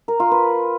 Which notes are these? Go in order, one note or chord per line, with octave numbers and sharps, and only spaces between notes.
A#4
F4
B4